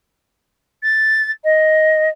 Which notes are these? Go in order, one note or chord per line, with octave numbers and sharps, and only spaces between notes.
A6
D#5